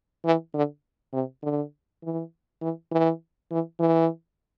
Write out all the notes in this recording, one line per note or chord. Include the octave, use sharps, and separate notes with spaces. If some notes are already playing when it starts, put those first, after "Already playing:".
E3
D3
C3
D3
E3
E3
E3
E3
E3